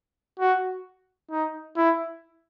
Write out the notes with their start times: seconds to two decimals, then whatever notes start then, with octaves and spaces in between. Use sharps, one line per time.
0.39 F#4
1.31 D#4
1.77 E4